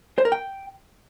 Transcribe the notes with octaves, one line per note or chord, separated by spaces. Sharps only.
C5
A#4
G5